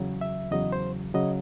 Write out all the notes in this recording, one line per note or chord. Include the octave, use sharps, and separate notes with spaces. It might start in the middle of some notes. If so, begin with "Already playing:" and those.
Already playing: E2 C#3 F#3
E5
E2 C#3 F#3 D#5
C5
C#3 F#3 D#5